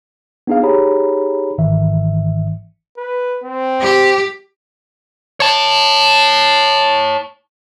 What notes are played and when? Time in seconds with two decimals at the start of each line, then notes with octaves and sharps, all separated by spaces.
0.47 B3 D4 D#4 G#4 F5
0.63 D#4 G4 G#4 C#5 A#5 B5
1.58 G1 G#2 D#3 E3 E5
2.97 B4
3.44 C4
3.82 G4
5.40 C#5 A5